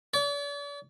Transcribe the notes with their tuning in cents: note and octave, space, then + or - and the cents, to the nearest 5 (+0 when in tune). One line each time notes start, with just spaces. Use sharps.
D5 -45